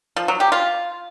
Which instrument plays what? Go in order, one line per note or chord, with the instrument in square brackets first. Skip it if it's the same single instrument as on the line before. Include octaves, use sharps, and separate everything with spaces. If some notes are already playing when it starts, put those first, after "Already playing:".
[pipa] F3
F#3
G4
F4